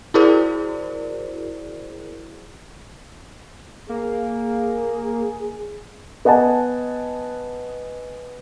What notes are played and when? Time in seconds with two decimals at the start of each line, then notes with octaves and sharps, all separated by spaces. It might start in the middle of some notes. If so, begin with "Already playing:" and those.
0.14 E4 F#4 G#4 A#4 C5 D5
3.89 A#3 G#4
6.25 B3 D#5 F#5 G#5 A5